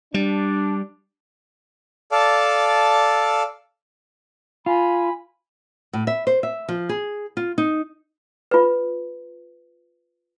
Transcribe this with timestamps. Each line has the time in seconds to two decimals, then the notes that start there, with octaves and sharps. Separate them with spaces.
0.14 G3 D4
2.12 A4 D5 F5 A5
4.66 F4 G#5 B5
5.93 A2
6.07 E5
6.27 C5
6.43 E5
6.68 F3
6.89 G#4
7.37 F4
7.58 D#4
8.51 F4 B4